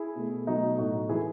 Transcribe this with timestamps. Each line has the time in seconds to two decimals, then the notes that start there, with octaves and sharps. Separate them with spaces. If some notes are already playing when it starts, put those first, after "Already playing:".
Already playing: E4 G#4
0.16 B2 A3
0.47 B2 F#3 A3 D#4 F#4
0.78 A2 F#3 A3 D#4 F#4
1.09 E3 G#3 E4 G#4